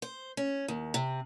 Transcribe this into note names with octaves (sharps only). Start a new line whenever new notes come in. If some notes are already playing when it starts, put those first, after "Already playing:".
C5
C#4
D#2
C3